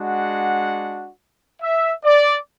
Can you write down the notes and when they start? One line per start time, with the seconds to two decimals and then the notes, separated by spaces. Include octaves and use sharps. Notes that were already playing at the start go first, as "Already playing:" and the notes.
Already playing: G#3 D4 F#4 F#5
1.62 E5
2.05 D5